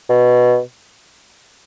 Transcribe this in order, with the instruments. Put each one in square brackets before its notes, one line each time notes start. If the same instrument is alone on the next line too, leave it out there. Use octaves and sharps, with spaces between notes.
[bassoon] B2